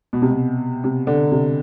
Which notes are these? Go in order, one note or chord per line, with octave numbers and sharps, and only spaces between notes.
B2
C3
B2
C3
D3
C3